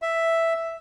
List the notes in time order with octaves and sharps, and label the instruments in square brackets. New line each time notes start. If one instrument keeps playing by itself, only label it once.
[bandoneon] E5